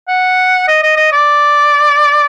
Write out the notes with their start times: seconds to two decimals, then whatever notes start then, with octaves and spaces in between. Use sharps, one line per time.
0.08 F#5
0.68 D#5
0.83 D#5
0.97 D#5
1.12 D5